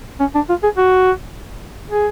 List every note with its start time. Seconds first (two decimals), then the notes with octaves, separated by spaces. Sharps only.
0.20 C#4
0.35 D4
0.49 F4
0.63 G#4
0.77 F#4
1.90 G#4